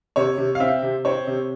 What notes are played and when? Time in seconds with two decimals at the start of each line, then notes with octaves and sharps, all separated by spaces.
0.16 C3 C#5
0.38 C3
0.55 F5
0.60 C4 E5
0.82 C3
1.05 C4 C#5
1.27 C3